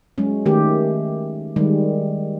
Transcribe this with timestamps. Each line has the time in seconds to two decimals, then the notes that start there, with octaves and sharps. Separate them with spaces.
0.18 F#3 G#3 C#4
0.46 D#3 A3 G4
1.56 D#3 G3 G#3